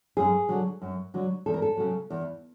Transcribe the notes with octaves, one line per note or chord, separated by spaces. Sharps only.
F#2 G#4
D3 F#3
F#2
D3 F#3
E2 A4
A#4
A4
C#3 F#3
E2